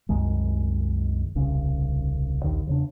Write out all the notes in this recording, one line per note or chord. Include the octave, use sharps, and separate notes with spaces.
C2 F#2 D#3 G#3
D#1 C2 C#3 C#4
A#1 D#2 D#3
E2 C#3 D4